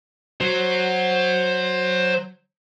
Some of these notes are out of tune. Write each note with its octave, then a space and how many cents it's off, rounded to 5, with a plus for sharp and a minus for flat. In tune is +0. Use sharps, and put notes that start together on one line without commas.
F#3 +0 C5 +15